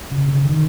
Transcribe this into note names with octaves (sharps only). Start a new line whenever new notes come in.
C#3
C#3
D#3